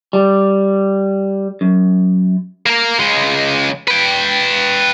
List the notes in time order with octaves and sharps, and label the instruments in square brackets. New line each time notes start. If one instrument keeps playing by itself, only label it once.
[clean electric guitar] G3
F#2
[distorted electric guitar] A#3 A#4
C#2 G#3
B4 G5